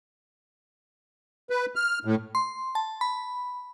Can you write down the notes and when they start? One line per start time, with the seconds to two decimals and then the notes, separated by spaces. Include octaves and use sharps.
1.50 B4
1.75 F6
2.05 A2
2.35 C6
2.75 A5
3.01 B5